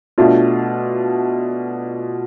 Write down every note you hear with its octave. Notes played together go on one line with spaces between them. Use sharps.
B2 A3 D4 F4